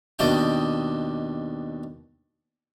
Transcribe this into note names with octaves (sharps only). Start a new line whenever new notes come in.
D#2 B2 D4 D#5 G5